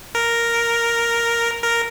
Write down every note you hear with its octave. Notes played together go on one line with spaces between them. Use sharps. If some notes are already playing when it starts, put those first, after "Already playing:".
A#4
A#4